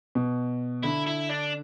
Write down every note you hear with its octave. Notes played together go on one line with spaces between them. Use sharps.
B2
D3 E4
E4
D4